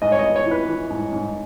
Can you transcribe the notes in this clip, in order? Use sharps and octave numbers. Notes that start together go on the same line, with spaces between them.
G#2 D#5
C#5
D#5
B3
C#5
E3
B4
E3
G#2
G#2